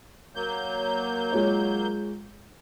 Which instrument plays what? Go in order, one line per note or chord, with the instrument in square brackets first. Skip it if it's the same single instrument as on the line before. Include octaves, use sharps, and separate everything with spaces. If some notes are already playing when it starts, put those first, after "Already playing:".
[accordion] F#3 A#3 G6
[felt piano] G#3 F4 C#5